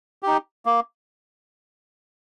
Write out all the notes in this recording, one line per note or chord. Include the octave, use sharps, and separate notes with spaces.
D#4 G4
A#3